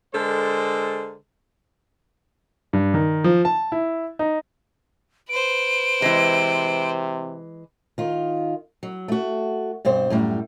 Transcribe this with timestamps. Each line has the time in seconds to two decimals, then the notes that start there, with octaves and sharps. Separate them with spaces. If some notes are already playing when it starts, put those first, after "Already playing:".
0.15 D3 G#3 A4 A#4 C5
2.73 G2
2.94 D#3
3.24 F3
3.45 A5
3.72 E4
4.19 D#4
5.29 B4 C5 D7
6.02 C3 E3 G#3
7.98 D#3 F4
8.83 F#3
9.08 A3 F#4
9.85 G2 B2 C4 C5
10.10 F#2 A2 G3